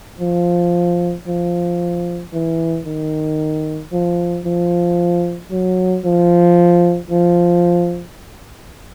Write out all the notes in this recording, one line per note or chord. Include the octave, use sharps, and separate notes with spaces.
F3
F3
E3
D#3
F3
F3
F#3
F3
F3